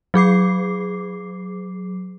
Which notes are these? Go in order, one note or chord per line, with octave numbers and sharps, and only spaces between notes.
F#3 G#4 D6 C7